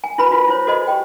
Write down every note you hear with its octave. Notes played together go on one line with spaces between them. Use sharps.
G#5
E4 F#4 B4 B5
F4 F#4 B4
E4 F4 C5 C#5
F#4 A4 C5 D#5 G#5
G4 G5